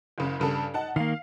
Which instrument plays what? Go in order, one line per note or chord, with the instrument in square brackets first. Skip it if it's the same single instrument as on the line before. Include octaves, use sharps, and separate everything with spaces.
[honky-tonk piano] F#1 C#3
G2 C#3 A4
D#4 F#5 A5
[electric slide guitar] D#3 A#3 [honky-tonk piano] F5